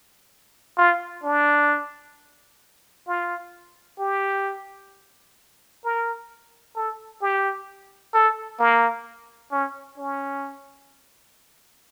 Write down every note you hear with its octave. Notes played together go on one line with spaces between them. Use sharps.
F4
D4
F4
G4
A#4
A4
G4
A4
A#3
C#4
C#4